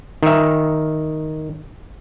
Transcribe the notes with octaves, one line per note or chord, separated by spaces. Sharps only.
D#3 E5